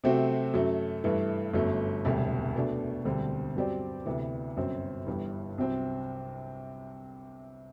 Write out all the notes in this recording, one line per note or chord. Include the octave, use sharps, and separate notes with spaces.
C3 F#3 A3 C4 F#4
F#2 F#3 A3
G2 E3 A3
G1 F#2 F#3 A3
E1 D2 C3 G3
B2 A3 D4
E1 D2 D3 G3 C4
G2 F#3 C4 G4 D5
D2 C3 E3 B3
G1 F#2 F#3 C4
G1 G2 E3 G3
C2 C3 F#3 C4